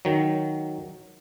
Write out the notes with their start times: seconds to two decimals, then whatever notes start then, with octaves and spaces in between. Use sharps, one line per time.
0.05 D#3 F#3